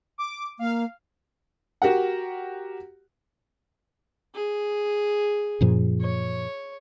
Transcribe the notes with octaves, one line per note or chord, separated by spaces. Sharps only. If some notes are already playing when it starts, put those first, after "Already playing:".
D6
A#3 F5
F#4 G4 A#4 F#5
G#4
F#2 A#2 F3
C#5